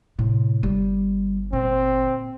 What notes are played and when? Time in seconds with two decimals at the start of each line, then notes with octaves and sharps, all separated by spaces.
0.19 A2 C3
0.63 G1 G3
1.53 A#2 C4